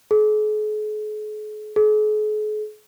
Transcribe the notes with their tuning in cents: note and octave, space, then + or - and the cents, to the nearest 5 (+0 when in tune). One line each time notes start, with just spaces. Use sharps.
G#4 +45
G#4 +45